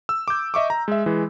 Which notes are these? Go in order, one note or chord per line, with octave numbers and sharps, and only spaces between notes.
E6
D6 G6
D#5 E5 C#6 D6
A#5
G#3 E5
E3 G#3